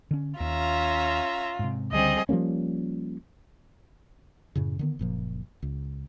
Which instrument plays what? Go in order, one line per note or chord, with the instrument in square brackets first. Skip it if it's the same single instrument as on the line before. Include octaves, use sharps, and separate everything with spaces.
[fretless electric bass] D3 C#4
[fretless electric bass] D#2 [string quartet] C#4 E5 A#5 [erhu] F4
[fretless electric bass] G#2 C3
[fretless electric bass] C#2 D3 [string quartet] G3 C4 G#4 [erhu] D#5
[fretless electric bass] F3 G3 A#3 C#4
F#2 A2 C#3
D3 D#3 B3
F#1 A#2 F3
C#2